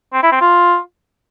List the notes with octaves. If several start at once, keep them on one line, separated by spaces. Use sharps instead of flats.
C4
E4
C4
F4